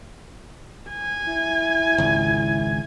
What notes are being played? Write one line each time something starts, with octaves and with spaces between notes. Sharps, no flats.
G#5
E4
G#1 C#2